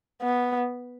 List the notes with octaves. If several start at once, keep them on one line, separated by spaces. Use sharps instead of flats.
B3